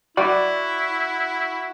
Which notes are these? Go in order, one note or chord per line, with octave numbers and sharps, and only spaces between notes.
E4 F#4 D5 B5